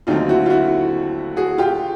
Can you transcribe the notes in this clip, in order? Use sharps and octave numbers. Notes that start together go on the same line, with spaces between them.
D#2 D3 F#3 A3 C4 D#4 F4
E4 F#4
F4
E4 F#4
F#4 G#4
F4 G4